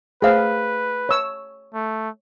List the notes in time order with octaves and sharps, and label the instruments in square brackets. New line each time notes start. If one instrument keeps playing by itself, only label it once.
[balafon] A3 C5 [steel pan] G#4 F5 [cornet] B4
[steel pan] C#5 E6
[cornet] A3